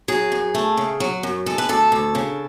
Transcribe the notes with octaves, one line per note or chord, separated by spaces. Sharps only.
F#3 G#4
F#2
A3
C#3
F#3
F#2
G#3 A4
B4
D2 A4
D2
C#3